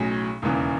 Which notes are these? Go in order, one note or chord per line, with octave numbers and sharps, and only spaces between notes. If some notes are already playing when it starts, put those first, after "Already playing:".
Already playing: B1 A2 F#3 C#4 G#4
E1 D#2 C#3 E3